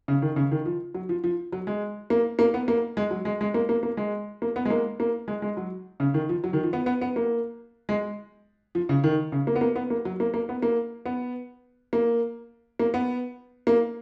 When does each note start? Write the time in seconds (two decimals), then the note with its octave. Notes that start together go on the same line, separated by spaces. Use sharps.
0.08 C#3
0.22 D#3
0.36 C#3
0.52 D#3
0.66 F3
0.94 F#3
1.09 F3
1.24 F3
1.52 F#3
1.67 G#3
2.10 A#3
2.39 A#3
2.54 B3
2.68 A#3
2.97 G#3
3.11 F#3
3.25 G#3
3.41 G#3
3.54 A#3
3.69 A#3
3.83 A#3
3.97 G#3
4.42 A#3
4.56 B3
4.65 G#3
4.70 A#3
5.00 A#3
5.28 G#3
5.42 G#3
5.57 F#3
6.00 C#3
6.14 D#3
6.29 F3
6.44 F#3
6.53 D#3
6.63 F3
6.73 B3
6.86 B3
7.01 B3
7.16 A#3
7.89 G#3
8.75 F3
8.89 C#3
9.04 D#3
9.32 C#3
9.47 A#3
9.56 B3
9.61 A#3
9.76 B3
9.90 A#3
10.05 F#3
10.20 A#3
10.34 A#3
10.49 B3
10.62 A#3
11.06 B3
11.93 A#3
12.79 A#3
12.94 B3
13.67 A#3